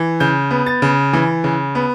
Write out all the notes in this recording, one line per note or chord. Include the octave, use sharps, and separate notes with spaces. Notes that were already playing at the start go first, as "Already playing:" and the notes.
Already playing: E3
C#3 G6
B3
A6
C#3
E3
C#3
B3